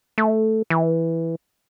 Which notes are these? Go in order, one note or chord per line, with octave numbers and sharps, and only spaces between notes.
A3
E3